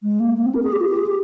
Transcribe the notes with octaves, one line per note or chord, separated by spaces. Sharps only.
G#3
A#3
A#3
C4
A#4
G#4
G4
F4
G4
G#4
G4